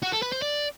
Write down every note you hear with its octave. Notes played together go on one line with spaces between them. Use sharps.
F#4
A4
B4
C5
D5